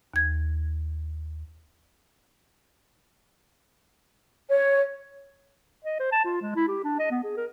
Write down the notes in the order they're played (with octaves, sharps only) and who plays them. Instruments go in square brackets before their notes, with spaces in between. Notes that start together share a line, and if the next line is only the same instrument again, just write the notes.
[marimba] D#2 G#6
[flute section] C#5
[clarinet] D#5
C5
A5
F4
G#3
E4
G4
D4
D#5
B3
G#4
A#4